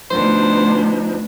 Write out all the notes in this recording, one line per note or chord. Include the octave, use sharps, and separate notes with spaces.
D2 F3 B3 D4 D#4 C5